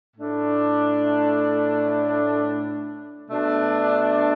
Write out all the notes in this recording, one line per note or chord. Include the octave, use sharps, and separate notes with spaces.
A2 A3 D4
B2 A3 D4